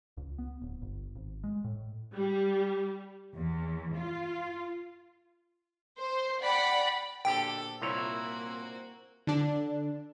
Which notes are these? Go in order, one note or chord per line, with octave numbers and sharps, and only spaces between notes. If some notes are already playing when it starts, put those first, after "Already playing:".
C#2
B3
D1
G1
G#1
G#3
A2
G3
E2
F4
C5
D5 F#5 G5 B5
A#1 B2 D3 G4 A4 G5 A5
C2 A#2 A#3 E4 F#4 C#5
C4
D3 D4